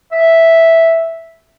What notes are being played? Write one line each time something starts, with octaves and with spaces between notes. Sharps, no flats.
E5